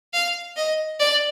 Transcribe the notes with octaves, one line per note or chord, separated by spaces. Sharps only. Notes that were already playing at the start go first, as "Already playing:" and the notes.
F5
D#5
D5